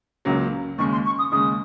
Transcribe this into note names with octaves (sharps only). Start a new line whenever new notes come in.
C#2 C#3 F#3 A#3
D#2 C#3 G#3 C#6
C6
C#6
D#6
D#2 C#3 G#3 D#6